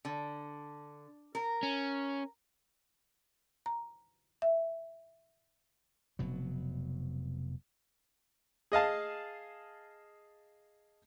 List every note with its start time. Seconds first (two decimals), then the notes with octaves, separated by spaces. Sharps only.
0.05 D3
1.35 A#4
1.63 C#4
3.66 A#5
4.42 E5
6.19 F1 B2 F#3
8.72 G#4 D#5 F5 A5